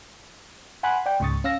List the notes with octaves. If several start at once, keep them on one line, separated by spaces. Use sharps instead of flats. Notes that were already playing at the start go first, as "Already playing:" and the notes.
F#5 G#5 B5 C6 F#6
D5 G5
C#2 G#2 C#3 C#6 D#6 A6
C#4 F5 E6 A#6